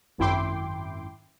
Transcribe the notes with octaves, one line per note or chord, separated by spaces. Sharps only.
G#1 F#2 E4 G5 C6 D6